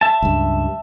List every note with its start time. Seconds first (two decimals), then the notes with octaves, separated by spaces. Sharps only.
0.01 E5 A5
0.22 C#2 G2